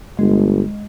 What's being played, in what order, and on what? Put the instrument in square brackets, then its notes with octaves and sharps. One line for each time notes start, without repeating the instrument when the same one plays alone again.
[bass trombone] G1 [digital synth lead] G#3